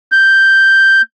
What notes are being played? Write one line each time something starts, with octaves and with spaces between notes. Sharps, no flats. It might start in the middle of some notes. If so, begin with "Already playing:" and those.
G6